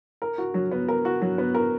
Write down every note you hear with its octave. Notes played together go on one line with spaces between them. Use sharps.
A#4
F#4
F#3
B3
A#4
F#4
F#3
B3
A#4